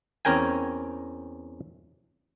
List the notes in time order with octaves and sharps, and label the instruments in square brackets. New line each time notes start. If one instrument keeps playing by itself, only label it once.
[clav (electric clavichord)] E2 C4 C#4 A#4 G5 G#5